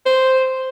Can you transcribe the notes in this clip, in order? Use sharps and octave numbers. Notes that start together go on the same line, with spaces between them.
C5